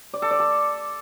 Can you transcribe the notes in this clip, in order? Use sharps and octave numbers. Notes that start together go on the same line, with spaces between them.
D5
A4
D5
A4